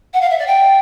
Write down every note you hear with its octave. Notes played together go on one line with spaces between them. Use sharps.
F#5
F5
E5
D5
G5